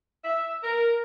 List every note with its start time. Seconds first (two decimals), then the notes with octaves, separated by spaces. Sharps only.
0.23 E5
0.62 A#4